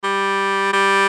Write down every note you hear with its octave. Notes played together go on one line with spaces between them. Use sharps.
G3
G3